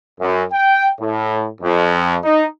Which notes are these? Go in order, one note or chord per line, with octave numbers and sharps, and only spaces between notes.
F#2
G5
A2
F2
D#4